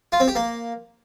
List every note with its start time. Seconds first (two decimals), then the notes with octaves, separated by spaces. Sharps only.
0.12 F4
0.20 C4
0.28 G4
0.35 A#3